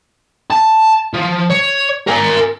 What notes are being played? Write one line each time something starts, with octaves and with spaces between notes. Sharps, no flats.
A5
F3
C#5
A#4 G#5